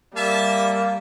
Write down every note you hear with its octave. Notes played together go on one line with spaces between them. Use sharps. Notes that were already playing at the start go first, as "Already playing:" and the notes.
G3 A#3 E5 A5